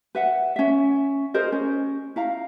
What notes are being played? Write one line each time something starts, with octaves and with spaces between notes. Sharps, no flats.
B4 E5 F#5
C#4 E5
G#4 A#4 C5 D#5
C#4
E4 F5 A#5